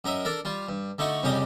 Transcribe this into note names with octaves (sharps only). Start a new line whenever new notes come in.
F#2 A#4 D#5 E5
D4 A4 A#4
G3 F4
G2
D3 A3 D#4 F#4 C#6
C2 F2 C#3 G3 G4 D#5